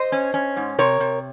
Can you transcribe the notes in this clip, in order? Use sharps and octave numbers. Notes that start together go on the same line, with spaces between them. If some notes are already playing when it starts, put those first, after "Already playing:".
Already playing: C5 D#5
C#4
C#4
G#2
C3 A#4 C#5
C3